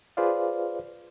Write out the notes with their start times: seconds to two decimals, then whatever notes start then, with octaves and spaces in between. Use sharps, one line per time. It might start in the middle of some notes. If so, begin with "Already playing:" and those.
0.17 F4 G#4 B4 C5 D5 F5